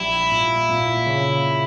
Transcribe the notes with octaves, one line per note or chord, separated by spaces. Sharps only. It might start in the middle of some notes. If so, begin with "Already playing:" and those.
Already playing: A#1 G3 E4
A#2
A#2
C#3